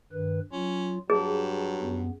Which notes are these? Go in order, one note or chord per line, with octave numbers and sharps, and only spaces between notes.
G2 D#3 B4
F#3 C#4 F4
G2 F#3 G#4 A5
F#2 B3